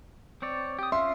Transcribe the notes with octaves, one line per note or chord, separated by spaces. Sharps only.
C4 C#5 D5
G4 D#6
C#4 F4 E5 F5 C6